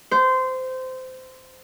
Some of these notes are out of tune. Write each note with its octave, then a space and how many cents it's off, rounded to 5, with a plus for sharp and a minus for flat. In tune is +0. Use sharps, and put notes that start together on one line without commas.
C5 -20